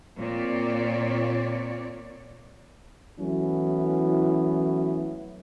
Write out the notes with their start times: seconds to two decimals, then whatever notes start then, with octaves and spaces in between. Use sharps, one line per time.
0.16 A#2 C4 C#5 D5
3.19 E3 F#3 A3 B3 C#4 E4